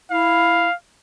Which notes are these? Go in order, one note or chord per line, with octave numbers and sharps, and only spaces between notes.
E4 F5